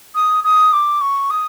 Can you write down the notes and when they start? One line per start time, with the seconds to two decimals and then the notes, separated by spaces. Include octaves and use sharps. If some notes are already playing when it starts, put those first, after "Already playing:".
0.15 D#6
0.44 D#6
0.72 D6
1.01 C#6
1.30 D#6